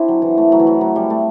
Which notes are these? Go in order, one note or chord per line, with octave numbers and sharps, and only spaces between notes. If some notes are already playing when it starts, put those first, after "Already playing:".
Already playing: C4 D4 E4
F#3
E3
A3
F#3
E3
F#3
F#3
G3
A3